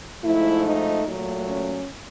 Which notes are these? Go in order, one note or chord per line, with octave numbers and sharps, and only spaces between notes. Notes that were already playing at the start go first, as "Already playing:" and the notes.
G#2 F3 A3 E4
D#4
A#2 F#3 A3
C#4